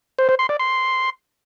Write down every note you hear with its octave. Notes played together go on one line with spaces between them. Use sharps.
C5
C5
C6
D5
C6